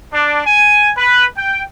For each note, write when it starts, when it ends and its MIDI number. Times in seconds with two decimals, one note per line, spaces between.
0.13 0.42 62
0.45 0.91 80
0.97 1.26 71
1.36 1.62 79